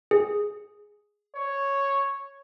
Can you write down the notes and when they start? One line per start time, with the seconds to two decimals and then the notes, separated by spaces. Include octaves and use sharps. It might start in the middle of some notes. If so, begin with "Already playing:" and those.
0.11 G#4
1.36 C#5